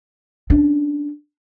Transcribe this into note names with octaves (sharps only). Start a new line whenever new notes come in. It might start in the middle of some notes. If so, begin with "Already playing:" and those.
C#4 D4